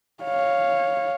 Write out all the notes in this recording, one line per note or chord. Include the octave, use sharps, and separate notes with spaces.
C#5 F5